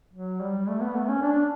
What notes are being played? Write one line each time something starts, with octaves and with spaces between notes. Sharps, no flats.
F#3
G3
A3
B3
A3
C#4
D4